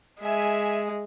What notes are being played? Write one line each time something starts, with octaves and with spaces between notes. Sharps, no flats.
G#3 E5 G#5